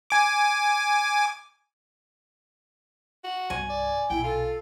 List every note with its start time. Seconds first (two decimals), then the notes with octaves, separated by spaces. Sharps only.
0.10 G#5 D6
3.24 F#4
3.50 C2 G2 G#5
3.70 D5
4.10 B1 A#2 E4 G5
4.24 F4 A4